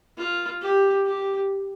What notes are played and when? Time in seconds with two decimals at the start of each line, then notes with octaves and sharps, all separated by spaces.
0.17 F4
0.61 G4
1.05 G4